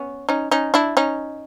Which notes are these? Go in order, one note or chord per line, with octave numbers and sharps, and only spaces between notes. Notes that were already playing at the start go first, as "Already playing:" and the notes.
Already playing: B3 C#4
C#4 D#4
C#4 D#4
D4 E4
C#4 D#4